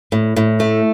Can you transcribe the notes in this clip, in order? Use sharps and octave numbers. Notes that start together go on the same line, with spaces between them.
A2
A2
A3